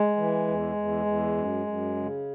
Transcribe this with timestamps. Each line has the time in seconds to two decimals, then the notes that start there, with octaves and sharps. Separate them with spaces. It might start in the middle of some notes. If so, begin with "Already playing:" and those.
Already playing: G#3
0.17 E3
0.47 E2
0.76 E2
1.06 E2
1.36 F#2
1.66 F#2
1.96 C#3